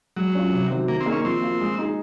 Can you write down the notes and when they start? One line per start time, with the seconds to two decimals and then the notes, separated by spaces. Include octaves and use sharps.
0.17 F#3 G#3
0.35 C#4 F4
0.53 C3
0.70 D#3 F#3 C4
0.88 D#3 A#3
1.01 C4
1.06 A#3 D#4 G#4
1.12 C#4
1.24 F3 C4
1.42 A#3 F4
1.61 G#3
1.78 D#4 G#4